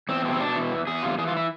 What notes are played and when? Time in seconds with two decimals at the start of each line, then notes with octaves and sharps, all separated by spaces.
0.09 E2 C4
0.25 B2 C4
0.33 E4
0.40 B2 D4
0.56 E3
0.71 E2
0.87 E2 G#4
1.03 C3 F4
1.18 E3 G#4
1.27 F4
1.37 E4